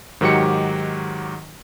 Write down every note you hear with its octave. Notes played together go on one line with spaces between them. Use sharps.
G#2 D#3 F#3 F#4 G4 C#7